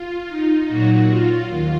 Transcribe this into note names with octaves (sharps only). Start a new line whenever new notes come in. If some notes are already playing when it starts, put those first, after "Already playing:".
Already playing: F4
D#4
A#2 F#3 F#4
F4
D#2 F4